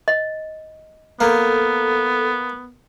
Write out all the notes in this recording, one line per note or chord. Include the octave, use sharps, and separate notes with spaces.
D#5
A#3 B3 A4